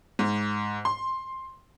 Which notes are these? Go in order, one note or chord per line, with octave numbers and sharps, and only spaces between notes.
G#2
C6